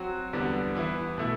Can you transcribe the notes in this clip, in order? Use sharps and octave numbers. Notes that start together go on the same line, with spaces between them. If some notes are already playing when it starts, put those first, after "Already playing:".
Already playing: F#3 C4 F#4
E2 D3 G3 B3
E3 B3 E4
B2 A3 E4